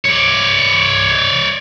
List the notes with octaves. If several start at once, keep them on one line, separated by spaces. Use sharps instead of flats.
C#5 D5